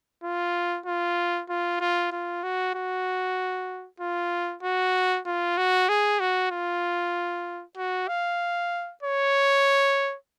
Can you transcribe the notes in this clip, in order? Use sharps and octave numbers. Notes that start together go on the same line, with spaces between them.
F4
F4
F4
F4
F4
F#4
F#4
F4
F#4
F4
F#4
G#4
F#4
F4
F#4
F5
C#5